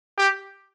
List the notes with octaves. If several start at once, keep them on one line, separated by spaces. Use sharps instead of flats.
G4